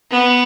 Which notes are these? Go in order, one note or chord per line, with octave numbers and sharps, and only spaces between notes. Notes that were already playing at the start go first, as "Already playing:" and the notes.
B3